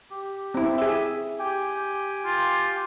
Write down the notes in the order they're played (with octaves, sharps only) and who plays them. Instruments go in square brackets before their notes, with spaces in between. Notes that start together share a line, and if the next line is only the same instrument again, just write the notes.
[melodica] G4
[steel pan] C4 E4
G#4 E5
[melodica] G4 G5 G#5
[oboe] F4